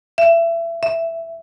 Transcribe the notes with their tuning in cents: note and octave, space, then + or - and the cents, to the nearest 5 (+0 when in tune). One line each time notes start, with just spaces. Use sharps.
E5 +30
E5 +10